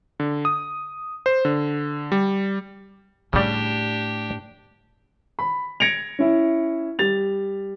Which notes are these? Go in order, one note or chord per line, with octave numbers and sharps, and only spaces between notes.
D3
D#6
C5
D3
G3
A2 C#3 G3 D4 G4
B5
G#6 A#6 C#7 D7 F7
C#4 E4
G3 A6 F7